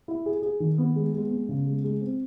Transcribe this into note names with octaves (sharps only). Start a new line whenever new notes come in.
E4
G#4
G#4
D#3
B3
G#3
G#3
B3
C#3
G#3
G#3
C4